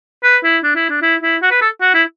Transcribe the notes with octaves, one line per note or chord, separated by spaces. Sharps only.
B4
E4
D4
E4
D4
E4
E4
F#4
B4
A4
F#4
E4